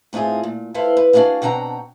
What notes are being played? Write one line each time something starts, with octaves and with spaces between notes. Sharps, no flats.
A2 C4 D#4 F4 G#4
A#2
E4 A4 B4 C5 F5
B4
D4 F#4 G#4 D5 F5
B2 C4 D4 F#5 G5 A#5